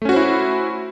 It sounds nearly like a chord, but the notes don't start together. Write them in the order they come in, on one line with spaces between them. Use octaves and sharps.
A3 C#4 F#4 C5 E4